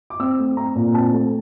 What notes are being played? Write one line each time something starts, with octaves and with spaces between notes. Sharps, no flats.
D6
C4 E6
A3
C4 A#5
A#2
C4 A5
A3